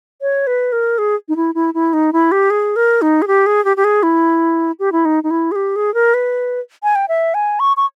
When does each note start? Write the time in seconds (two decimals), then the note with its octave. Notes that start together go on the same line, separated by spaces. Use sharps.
0.21 C#5
0.47 B4
0.72 A#4
0.98 G#4
1.29 D#4
1.36 E4
1.55 E4
1.74 E4
1.93 D#4
2.13 E4
2.32 G4
2.50 G#4
2.76 A#4
3.02 D#4
3.22 G#4
3.27 G4
3.46 G#4
3.65 G4
3.77 G4
3.84 G#4
4.03 E4
4.79 G4
4.92 E4
5.05 D#4
5.24 D#4
5.31 E4
5.52 G#4
5.56 G4
5.76 G#4
5.94 A#4
6.14 B4
6.83 G#5
6.95 G5
7.09 E5
7.34 G#5
7.60 C#6
7.77 C#6